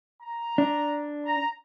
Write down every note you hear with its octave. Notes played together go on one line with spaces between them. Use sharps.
A#5
D4
A#5